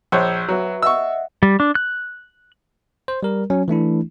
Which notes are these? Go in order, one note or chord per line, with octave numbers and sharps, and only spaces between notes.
A#1 C5 C#5 E6 G6
F#3 F#4 B4 E5
D#5 E5 F#5 C#6 E6
G3
D4
F#6
C5
G3 A#4
F#3 C#4
E3 A3 D4 E4